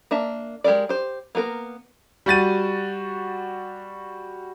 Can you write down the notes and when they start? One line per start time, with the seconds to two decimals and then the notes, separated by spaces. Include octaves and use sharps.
0.11 A#3 D4 E5 A5
0.64 G#3 G4 G#4 A#4 D5
0.89 G4 C5
1.35 A#3 B3 A4 A#4
2.26 G3 F#4 A6 D#7